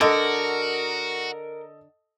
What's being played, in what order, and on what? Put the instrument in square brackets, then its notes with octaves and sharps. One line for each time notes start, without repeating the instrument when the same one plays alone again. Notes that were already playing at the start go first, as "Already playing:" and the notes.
[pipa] D3 [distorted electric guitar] F#4 [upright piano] A4 D#5 [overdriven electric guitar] A#4